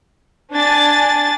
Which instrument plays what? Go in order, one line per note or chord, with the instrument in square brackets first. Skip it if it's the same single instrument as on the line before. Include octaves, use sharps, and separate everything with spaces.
[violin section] D4 G#5 A6